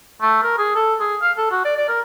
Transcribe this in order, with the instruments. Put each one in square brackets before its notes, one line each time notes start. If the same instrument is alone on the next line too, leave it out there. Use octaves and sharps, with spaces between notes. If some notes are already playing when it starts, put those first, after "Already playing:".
[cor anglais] A3
A#4
G#4
A4
G#4
F5
A4
F#4
D5
D5
A#4